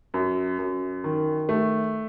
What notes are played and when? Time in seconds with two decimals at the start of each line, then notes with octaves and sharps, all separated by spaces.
0.14 F#2
0.59 F#2
1.04 D#3
1.49 A3